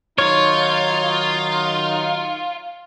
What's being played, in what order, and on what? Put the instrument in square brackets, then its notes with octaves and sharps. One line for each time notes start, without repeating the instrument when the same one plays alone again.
[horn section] D#3 F#3 D#4 [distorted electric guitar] F4 [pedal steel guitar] C#5